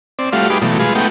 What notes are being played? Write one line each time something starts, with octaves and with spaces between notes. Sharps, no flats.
C4 D5
G3 A3 F4 F#4 F5
D#4 G4 G#4 B4 D6
B2 E3 F#3 A3
G#3 F4 G#4 B4
A3 B3 D#4 F#4 G5